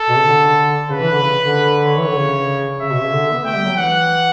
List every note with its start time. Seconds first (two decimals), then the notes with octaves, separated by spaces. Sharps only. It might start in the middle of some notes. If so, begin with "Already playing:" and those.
Already playing: A4
0.09 B2
0.17 C#3
0.25 D3
0.89 C#3 B4
1.00 E3
1.11 D3
1.21 C#3
1.43 D3
1.86 C#5
1.98 E3
2.07 D3
2.17 C#3
2.81 C#3 E5
2.92 B2
3.03 C#3
3.13 D3
3.33 B3
3.44 A3 G5
3.55 G3
3.66 F#3
3.77 E3 F#5